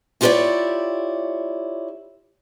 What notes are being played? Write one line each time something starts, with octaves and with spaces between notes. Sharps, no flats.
E4 F4 G4 A#4 C#5 D5